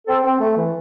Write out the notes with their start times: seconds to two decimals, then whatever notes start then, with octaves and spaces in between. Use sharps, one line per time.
0.07 C4 A4
0.24 C4
0.40 A3
0.57 E3